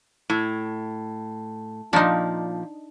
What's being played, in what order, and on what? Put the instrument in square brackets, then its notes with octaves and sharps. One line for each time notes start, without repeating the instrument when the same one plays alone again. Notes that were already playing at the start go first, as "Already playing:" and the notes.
[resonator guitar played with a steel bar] A2
[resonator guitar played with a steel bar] A#2 F3 [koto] D4 D#4